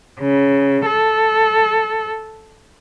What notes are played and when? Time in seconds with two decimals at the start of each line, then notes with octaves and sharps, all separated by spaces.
0.19 C#3
0.85 A4